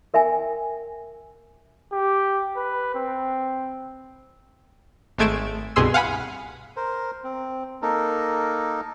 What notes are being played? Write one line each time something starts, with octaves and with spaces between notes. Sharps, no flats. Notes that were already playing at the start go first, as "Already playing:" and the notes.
A#4 E5 G5 G#5
G4
B4
C4
G#1 G#3 A3 G#6 D7 E7
C2 G2 B2 G#4 C6 E6
F5 F#5 G#5 B5
A#4 C5
C4
A#3 D#4 A4 A#4